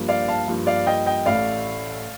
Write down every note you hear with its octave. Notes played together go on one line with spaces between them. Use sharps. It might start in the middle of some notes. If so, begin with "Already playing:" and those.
Already playing: G2 F3 A#3
D5 F5
F5 A5
G2 F3 A#3
D5 F5
D#5 G5
D#5 G5
A1 A2 A3 D5 F5